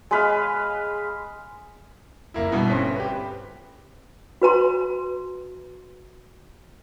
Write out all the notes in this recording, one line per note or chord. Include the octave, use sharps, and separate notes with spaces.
G#3 B4 F5
F#1 A#3 E4
G2 B2 B3 E4
G1 C4 C#4 B6
G4 B4
F#4 B4 A#5 C6